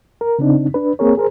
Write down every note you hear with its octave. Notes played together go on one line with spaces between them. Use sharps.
A#4
C#3 C4 D4 D#4
D4 B4
A#3 C4 G#4 A#4 C#5
G#4 A#4 C5